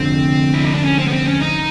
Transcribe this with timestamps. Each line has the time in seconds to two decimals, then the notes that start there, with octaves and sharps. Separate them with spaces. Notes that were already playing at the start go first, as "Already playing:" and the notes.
Already playing: F1 F2 D3 C4
0.54 E4
0.64 D#4
0.75 D4
0.84 C#4
0.99 C4
1.08 B3
1.12 C4
1.27 C#4
1.41 D#4